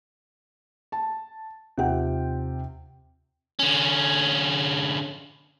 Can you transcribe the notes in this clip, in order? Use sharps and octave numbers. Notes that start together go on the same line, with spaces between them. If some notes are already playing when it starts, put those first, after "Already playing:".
A5
D#2 C3 F4 F#5 G5
D3 C#4